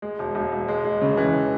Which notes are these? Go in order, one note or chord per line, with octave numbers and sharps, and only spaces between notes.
G#3
E1
E1
E1
G#3
G#3
C#3
E3